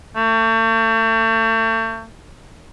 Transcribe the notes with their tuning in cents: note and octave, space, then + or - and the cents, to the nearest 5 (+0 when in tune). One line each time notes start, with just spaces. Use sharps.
A3 +35